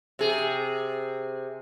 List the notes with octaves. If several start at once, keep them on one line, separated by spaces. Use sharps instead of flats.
C3 G#4